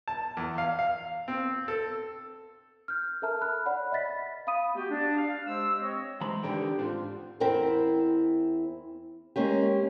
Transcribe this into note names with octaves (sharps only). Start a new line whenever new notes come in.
A5
E2
F5
F5
C4
A4
F6 G6
A4 A#4 E5 A5 A#5 F6
B5 F6 F#6
C#5 D5 F#5 B5
D#5 E5 B5 A6 B6
F5 B5 D#6 D#7
A3 B3 F#4 G4
D4
F5
G#3 G4 C5 E6
C4 C#5 D#5
E3 G#3 C5 A#5 B5
E2 D3 D#3 G4 G5
G#2 C4 D4 F4
E2 C4 E4 A#4 C5 G5
G#3 A#3 C#4 G4